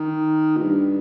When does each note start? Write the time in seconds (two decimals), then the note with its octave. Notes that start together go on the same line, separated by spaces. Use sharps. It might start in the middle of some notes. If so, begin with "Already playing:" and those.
Already playing: D#3
0.57 A#2
0.62 G2